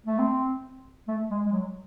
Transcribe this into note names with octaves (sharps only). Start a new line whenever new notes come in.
A3
C4
A3
G#3
G#3
F#3